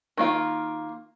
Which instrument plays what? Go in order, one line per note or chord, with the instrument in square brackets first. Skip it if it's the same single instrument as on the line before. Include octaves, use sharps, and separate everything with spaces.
[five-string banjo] D#3 A#3 F4